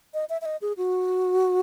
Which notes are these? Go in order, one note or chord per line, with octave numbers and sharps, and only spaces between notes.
D#5
E5
E5
D#5
G#4
F#4